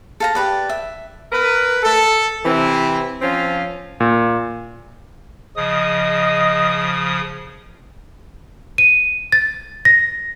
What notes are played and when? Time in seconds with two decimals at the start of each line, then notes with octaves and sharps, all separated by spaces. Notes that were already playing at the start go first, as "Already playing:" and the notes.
0.20 A4 F5 A#5
0.35 G4 B4 D5
0.69 E5
1.32 A#4 B4
1.83 A4
2.45 C3 E3 C4 E4
3.21 F3 C4 C#4 F4
4.00 A#2
5.57 C#3 F3 D#5 D#6
8.78 D#7
9.32 A6
9.85 A#6